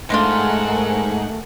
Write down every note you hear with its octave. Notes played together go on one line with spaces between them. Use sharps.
G#2 G#3 A3 D4 F4 G#4 A#4 F#5